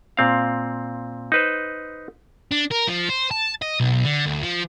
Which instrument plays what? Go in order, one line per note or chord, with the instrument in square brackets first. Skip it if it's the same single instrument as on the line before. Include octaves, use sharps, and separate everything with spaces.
[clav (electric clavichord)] A#2 C4 F5
D#4 B4 C5
[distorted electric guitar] D4
A#4
F3
C5
A5
D#5
B1
D3
D2
F3